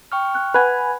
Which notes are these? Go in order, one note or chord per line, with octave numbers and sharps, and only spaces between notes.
G5 C#6 F6
F#6
B4 F#5 G#5 B5 F#6